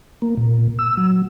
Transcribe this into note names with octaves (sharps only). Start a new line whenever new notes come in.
A#3
A#2
E6
F#3